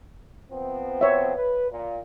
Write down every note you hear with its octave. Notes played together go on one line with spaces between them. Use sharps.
F3 B3 C4
C#5 E5
B4
A#2